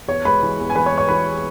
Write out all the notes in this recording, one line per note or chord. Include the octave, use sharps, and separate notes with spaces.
E2 C#5
G#3 B4 B5
E3
E2
G#5
E2 B4 B5
C#5 C#6
G#3
C#5 C#6
E3 B4 B5